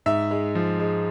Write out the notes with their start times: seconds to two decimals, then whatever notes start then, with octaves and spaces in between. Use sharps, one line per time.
0.06 G#2 E5
0.31 G#3
0.55 F3
0.79 G#3